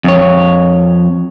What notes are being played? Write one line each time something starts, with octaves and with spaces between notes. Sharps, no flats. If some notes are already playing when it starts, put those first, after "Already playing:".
F2 C#5